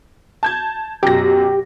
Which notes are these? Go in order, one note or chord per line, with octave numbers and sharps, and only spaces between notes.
A5 G6 G#6
F#2 B2 G4 A#6